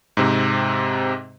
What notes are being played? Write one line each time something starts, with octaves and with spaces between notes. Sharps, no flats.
G#2 C3 C4